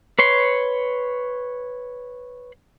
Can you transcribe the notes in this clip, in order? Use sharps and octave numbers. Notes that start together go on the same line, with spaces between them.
B4 C#5 C6